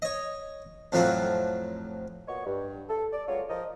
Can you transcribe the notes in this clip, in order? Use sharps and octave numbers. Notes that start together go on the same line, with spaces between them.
C#5 D#5
F2 A2 F3 F#3 C4 F4
A#2 B3 F#4 C#5 D#5 C#6
G2
A4
D5
C#2 F#3 G#3 F4 C#5
F3 A#4 D#5